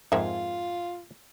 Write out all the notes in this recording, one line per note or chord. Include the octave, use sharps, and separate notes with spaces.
F2 G#2 A#3 F4 G#4 E5